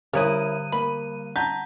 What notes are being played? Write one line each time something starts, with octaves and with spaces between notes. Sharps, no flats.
D3 G3 C#4 E4 A#4 F#6 D#7
A#3 B5
F#5 A5 A#5 G6